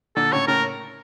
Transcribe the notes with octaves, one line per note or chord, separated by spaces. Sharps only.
A#2 D3 A4
A2 C#3 C#5
A2 C#3 A#4